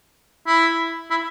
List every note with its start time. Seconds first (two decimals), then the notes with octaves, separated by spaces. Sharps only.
0.47 E4
1.10 E4